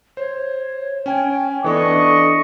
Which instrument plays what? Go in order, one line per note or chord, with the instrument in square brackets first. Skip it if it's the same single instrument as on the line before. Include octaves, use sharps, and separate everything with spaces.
[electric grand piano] C5 [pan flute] C#5
[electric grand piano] C#4 G#5 [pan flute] G5
[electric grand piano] E3 B3 D4 [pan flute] A4 [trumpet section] D#5 C#6